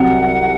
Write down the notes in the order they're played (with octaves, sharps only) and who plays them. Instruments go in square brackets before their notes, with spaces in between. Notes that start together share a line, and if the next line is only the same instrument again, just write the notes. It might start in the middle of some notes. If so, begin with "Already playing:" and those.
Already playing: [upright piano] C2 C3 F#3 [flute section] F#5